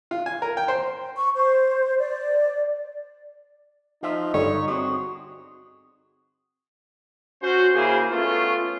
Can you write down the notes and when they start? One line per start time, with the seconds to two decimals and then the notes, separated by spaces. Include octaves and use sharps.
0.11 F4
0.26 G#5
0.42 A#4
0.57 G5
0.68 C5
1.16 C#6
1.35 C5
1.99 D5
4.03 F3 D#4 F4 E5
4.34 G2 D3 G3 C#5
4.68 C4 F#4 G#4
7.42 C#4 F#4 C5
7.75 C#3 A#3 E4 G#4 C5
8.11 A3 B3 C#4 F4